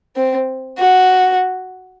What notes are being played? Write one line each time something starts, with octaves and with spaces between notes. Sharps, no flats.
C4
F#4